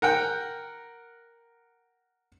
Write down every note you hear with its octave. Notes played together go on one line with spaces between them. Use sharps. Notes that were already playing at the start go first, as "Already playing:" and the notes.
A#4 F#5 G5